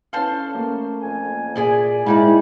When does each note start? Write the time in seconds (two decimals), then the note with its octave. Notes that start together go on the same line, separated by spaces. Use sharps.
0.13 C#4 A4 B4 C5 F5
0.54 A3 A#3 C#4
1.02 F2 G#5
1.55 A#2 E4 G#4 D5 G#5
2.06 G#2 A#3 D#4 E4 C#5 D5 G5 B5